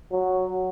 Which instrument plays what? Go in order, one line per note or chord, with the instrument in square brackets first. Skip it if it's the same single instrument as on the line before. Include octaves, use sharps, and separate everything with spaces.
[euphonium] F#3